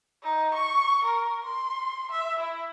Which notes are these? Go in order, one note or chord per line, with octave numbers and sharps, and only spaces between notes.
D#4
C#6
A#4
C6
E5
E4